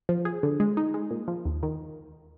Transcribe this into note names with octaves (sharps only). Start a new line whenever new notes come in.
F3
G#4
D3
G#3
D#4
G#3
A#2
F3
D#2
D#3